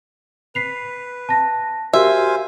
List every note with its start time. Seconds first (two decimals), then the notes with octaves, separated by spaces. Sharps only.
0.55 B4 B6 C7 F7
1.29 A5 A#6
1.93 F#4 G4 A#4 C5 E5 F5 G#5